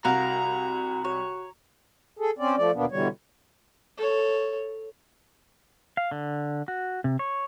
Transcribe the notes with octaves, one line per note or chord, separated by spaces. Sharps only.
C2 F#4 A#4 F5 F#5 A#5
F#4
F#4 C#5
G#4 A4
C4 C#4 D5
F3 A3 D5
D#2 B2 A#3 B3 D4
B2 D3 E3 G3 C#5
A4 C#5
F5
D3
F#4
C3
C#5